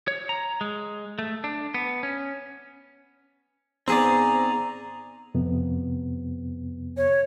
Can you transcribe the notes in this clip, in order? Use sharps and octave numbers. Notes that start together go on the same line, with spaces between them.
C#5
A#5
G#3
A3
D4
B3
C#4
G#2 B3 C4 G#4 D5 A#5
F2 C3 B3
C#5